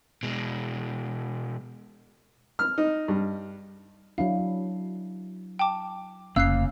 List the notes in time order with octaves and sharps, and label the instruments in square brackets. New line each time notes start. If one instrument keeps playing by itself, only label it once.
[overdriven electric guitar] B2 G#3
[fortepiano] F6
D#4
G2
[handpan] F#3 D4 E4 [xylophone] F5
[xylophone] G5 A5 D6
[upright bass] F1 [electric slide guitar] C#3 A#3 F5 [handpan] C#4 [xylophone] E6 F#6 C7